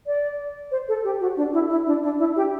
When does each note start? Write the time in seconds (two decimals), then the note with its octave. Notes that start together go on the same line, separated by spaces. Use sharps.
0.07 D5
0.71 C5
0.89 A4
1.04 G4
1.21 F#4
1.37 D4
1.53 E4
1.70 E4
1.87 D4
2.03 D4
2.19 E4
2.36 G4